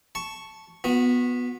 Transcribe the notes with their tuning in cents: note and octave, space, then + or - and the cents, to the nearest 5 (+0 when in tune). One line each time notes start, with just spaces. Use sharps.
A5 +0 C#6 +0
B3 +0 F#4 -35